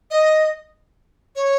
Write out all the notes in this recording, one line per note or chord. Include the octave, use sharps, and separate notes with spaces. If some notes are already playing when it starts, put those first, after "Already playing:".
D#5
C#5